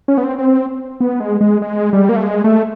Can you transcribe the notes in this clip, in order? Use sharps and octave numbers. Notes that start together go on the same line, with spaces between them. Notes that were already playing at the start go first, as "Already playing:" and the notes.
C#4
B3
C4
C4
B3
G#3
G#3
G#3
G3
A#3
A3
G#3
A3